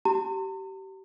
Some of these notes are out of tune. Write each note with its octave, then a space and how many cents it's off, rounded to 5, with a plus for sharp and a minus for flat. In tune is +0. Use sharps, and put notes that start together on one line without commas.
G4 -30 A#5 -45